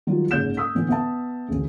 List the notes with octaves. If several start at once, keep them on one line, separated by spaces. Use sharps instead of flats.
D#3 F#3 G3 F4
F#1 G#2 C#5 G6 E7
D#6 E6 B6
A2 D3 E3 B3
B3 E5 A5
A1 D2 C#3